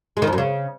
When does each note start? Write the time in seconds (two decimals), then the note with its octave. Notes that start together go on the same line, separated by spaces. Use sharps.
0.17 G#3
0.22 D#3
0.27 F2
0.33 F#2
0.38 C#3